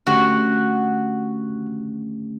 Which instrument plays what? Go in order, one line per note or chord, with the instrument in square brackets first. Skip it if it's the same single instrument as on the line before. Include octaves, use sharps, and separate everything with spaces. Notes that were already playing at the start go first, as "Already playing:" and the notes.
[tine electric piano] D3 A3 C#4 G4 [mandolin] F#4